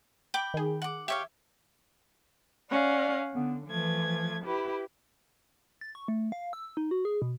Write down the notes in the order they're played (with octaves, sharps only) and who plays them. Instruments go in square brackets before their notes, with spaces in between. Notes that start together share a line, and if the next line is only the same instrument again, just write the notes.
[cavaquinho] G5 B5 [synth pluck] D6
[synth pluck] D#3 G#4
[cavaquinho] F#5 D6
[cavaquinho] G4 C#5 F5 [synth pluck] E5
[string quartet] C#4 F5 F#5 [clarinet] D5
[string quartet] D3 [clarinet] B3
[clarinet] E3 [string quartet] F3 A3 G#6
[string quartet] E4 G4 B4
[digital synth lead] A6
C#6
A3
F5
E6
D#4
F#4
G#4
B2